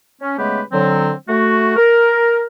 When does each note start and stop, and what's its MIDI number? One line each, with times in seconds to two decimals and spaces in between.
0.21 0.36 61
0.38 0.61 49
0.38 0.61 56
0.38 0.61 57
0.38 0.61 59
0.38 0.61 67
0.38 0.61 71
0.72 1.12 50
0.72 1.12 54
0.72 1.12 60
1.29 1.74 57
1.29 1.74 66
1.77 2.44 70